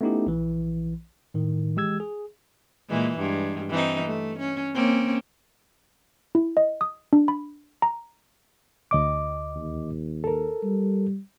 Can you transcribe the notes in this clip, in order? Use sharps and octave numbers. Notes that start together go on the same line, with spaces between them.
A3 B3 C#4 D#4 E4 G4
A#1 E3
A2 D#3
E3 G#3 G4 E6 G#6
G#4
A#2 E3 G#3
G2 G#3
E3 C4 D#4
A3
C#4
A#3 C4 C#4
E4
D#5
D#6
D4
B5
A#5
D2 D#5 D6
D#2
A4 A#4
G3